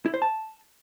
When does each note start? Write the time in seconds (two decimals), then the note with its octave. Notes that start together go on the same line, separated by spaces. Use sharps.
0.06 E4
0.14 C5
0.22 A5